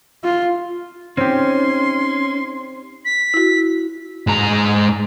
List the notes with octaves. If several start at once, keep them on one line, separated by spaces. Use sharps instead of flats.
F4
C4 C#4 D#4 G4 C6
B6
E4 F#4
G#2 A#5